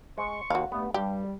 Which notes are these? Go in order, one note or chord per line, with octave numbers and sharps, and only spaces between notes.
G#3 C6 C#6
D#2 F#4 F5
G2 A3 B3
G2 G3 G4